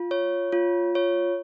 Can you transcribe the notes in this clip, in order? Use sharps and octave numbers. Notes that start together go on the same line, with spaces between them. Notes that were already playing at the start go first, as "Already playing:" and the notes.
Already playing: F4
C#5
F4
C#5